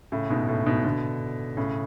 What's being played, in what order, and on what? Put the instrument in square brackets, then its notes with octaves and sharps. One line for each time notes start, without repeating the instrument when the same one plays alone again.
[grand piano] A2 C#3
G#2 B2
A2
G#2 B2
B2 D3
A2 C#3